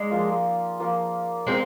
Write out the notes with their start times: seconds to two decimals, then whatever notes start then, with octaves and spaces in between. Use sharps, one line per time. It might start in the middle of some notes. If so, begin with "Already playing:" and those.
Already playing: G#3 D#4 G#4 D5
0.11 F3 A#3 F4
0.79 F3 A#3 F4
1.47 G#3 C4 F4 A#4